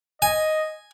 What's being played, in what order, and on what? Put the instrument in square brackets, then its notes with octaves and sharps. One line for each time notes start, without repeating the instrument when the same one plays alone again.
[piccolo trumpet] D#5 [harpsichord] G#5